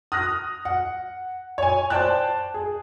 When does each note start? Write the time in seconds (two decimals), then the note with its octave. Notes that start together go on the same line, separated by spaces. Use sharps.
0.12 D#6 F6 F#6 A#6
0.65 F#5
1.58 C#5 G#5
1.90 C5 D5 G5 A5 F#6
2.54 G#4